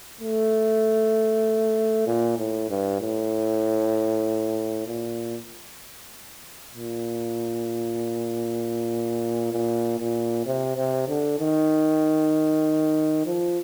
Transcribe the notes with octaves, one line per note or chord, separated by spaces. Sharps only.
A3
A#2
A2
G2
A2
A#2
A#2
A#2
A#2
C3
C3
D3
D#3
F3